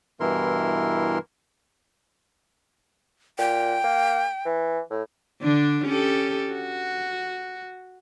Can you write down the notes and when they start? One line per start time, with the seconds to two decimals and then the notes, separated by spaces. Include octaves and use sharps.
0.20 G2 B2 E3 E4 A#4 C6
3.38 A#2 G5
3.84 A#3
4.45 E3
4.90 A2
5.42 D3 D4
5.85 C#4 G4 A4
6.53 F#4